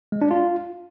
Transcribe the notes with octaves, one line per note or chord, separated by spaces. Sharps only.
G#3
D4
F4